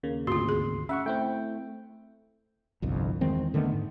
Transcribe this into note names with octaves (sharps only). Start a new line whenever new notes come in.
D#2 C#3 A#3
G#1 D2 F4 F#4 C6
G#4
C#4 E5 F#5 C#6
A3 C4 E4 G5
G1 C2 F2
E2 D#3 G#3 C4
D3 D#3 A3 B3
G#2